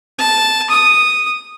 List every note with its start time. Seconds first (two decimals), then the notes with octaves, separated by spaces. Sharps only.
0.19 A5
0.69 D#6